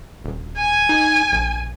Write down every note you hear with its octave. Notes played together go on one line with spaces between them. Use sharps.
D#1
G#5
D#4
A#1